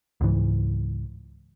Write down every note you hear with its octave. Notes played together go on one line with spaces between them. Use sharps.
C#2 G#2 E3